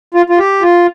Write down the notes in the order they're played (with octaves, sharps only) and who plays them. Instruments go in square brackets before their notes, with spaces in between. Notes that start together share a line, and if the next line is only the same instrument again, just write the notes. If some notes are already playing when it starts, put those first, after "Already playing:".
[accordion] F4
F4
G4
F4